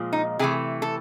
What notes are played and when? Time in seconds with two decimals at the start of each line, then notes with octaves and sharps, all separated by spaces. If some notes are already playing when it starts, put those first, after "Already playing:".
Already playing: A#2 F3 G#3
0.13 D#4
0.39 C3 E3 A3 G#4
0.82 A4